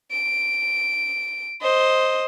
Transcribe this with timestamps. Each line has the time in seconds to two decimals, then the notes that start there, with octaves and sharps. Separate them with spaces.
0.11 D7
1.62 C5 D#5